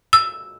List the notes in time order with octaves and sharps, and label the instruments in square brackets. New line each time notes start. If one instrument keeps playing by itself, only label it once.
[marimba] E6